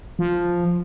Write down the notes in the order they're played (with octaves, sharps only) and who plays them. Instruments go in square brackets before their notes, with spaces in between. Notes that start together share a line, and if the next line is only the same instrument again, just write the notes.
[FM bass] F3